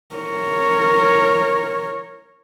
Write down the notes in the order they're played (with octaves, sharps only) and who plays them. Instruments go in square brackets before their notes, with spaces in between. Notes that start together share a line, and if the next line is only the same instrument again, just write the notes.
[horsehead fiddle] A#4 C#5